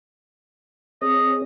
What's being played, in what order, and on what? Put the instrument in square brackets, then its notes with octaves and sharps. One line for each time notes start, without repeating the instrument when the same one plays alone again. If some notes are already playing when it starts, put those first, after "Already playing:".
[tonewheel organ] C4 G#4 C#5 [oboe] D#5